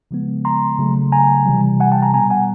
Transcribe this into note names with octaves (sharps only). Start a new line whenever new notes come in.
C#3 F3 G#3 B3
A#5 C6
C#3 F#3 A3
G#5 A#5
C3 E3 G3
F#5 G#5
G5 A5
G#5 A#5
B2 G3 B3 G#5 A#5
F#5 G#5